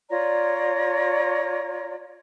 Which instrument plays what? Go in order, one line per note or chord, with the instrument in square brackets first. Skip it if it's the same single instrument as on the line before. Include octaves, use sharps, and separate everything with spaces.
[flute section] F4 C#5 D5 A#5